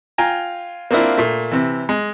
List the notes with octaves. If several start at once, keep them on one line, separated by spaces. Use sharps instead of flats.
F4 G5 G#5 A#5
A#3 C4 D4 E4 F4
A#2 A3
C3 E3
G#3